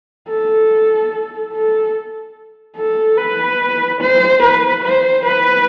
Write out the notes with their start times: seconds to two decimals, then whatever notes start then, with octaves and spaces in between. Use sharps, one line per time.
0.29 A4
1.53 A4
2.77 A4
3.18 B4
4.01 C5
4.43 B4
4.84 C5
5.25 B4